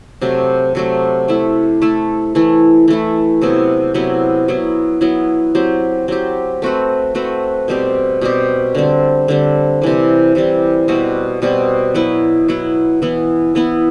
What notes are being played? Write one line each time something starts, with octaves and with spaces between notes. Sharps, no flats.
C3 F#3 A3
C3 F#3 A3
A3 E4 A4
A3 E4 A4
E3 A3 E4
E3 A3 E4
C3 F#3 B3 E4
C3 F#3 B3 E4
F#3 B3 E4
F#3 B3 E4
F#3 C4 G4
F#3 C4 G4
A3 C4 F#4 B4
A3 C4 F#4 B4
B2 G3 C4 G4
B2 G3 C4 G4
D3 G3 C4
D3 G3 C4
C3 E3 G3
C3 E3 G3
B2 G3 C4 F#4
B2 G3 C4 F#4
F#3 B3 E4 B4
F#3 B3 E4 B4
E3 B3 E4
E3 B3 E4